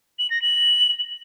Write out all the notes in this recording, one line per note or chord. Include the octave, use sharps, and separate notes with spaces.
F#7
A#6
F#7